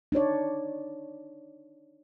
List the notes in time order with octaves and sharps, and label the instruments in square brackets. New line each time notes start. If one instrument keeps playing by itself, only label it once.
[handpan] D4 D#4 C#5 D5